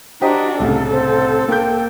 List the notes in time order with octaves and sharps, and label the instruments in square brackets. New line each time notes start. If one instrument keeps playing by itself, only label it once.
[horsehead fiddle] D4 F#4 [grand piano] G4 C5 D#5 [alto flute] A#5
[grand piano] C2 A2 C#3 [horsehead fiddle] A4
[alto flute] C4
[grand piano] A#3 G6 [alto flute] G5